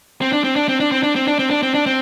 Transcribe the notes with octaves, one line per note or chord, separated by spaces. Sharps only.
C4
D4
C4
D4
C4
D4
C4
D4
C4
D4
C4
D4
C4
D4
C4